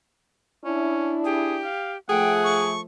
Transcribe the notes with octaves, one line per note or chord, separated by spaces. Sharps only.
C#4 D4 E4
G4 G#4
F5
F3 A3 G#4 F#5 G5
C#6